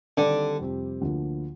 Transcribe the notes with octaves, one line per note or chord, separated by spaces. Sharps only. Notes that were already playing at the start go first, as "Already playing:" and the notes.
D3 D#3 G3 C4 G4
F2 C3 G3 C4 G4
D2 D3 F3 A#3